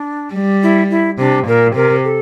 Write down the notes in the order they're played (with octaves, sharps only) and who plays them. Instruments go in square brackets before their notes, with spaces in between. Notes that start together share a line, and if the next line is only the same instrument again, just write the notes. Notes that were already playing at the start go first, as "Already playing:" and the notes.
Already playing: [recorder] D4
[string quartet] G3
[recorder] E4
E4
[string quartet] C3 [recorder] D4
[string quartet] A#2 [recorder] A#4
[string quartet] C3 [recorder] A#4
[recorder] A4